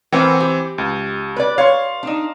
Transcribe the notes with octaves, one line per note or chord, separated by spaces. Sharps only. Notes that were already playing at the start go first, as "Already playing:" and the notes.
E3 C4 A#4 F#5 G5
G4
C#2
B4 D5
C#5 F5 C6
D4 D#4